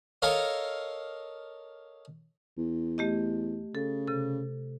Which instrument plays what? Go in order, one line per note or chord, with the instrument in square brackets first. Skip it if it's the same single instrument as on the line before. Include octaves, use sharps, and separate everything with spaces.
[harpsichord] A4 A#4 C#5 D#5 F5
[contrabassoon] E2
[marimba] A3 G4 D#5
[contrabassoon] C#3 [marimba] A4
[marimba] C3 A4